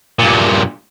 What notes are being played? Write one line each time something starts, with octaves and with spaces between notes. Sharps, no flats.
G2 A#2